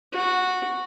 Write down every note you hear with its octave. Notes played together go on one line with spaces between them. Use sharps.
F#4